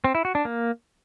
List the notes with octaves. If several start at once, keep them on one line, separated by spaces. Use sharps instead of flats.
C4
E4
F#4
D4
A#3